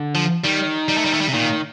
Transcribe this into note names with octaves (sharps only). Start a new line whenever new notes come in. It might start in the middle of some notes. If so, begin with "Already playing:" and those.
Already playing: D3
F3
D#3 G3
G3
A3
G3
A3
G3
C3
A#2 D#3